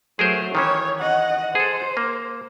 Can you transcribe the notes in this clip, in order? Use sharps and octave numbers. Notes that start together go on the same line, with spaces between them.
F#3 A3 G#4 A#4 C5
D#3 E3 C#4 C#5
D#5 F#5
G#4 A4 C5
A#3